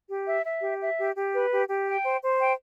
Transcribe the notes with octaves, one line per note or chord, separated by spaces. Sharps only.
G4
E5
E5
G4
E5
G4
G4
B4
G4
G4
G5
C5
C5
G5